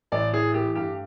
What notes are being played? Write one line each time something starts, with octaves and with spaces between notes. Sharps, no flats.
A1 D5
E3 G#4
A3 G4
G2 G4